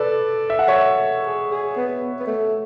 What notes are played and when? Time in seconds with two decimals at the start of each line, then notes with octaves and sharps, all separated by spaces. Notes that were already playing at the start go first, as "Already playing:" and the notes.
Already playing: A4 B4 D5
0.50 E5
0.59 F#5
0.68 C#5 E5
1.26 G#4
1.51 G#4
1.76 B3
2.19 B3
2.27 A3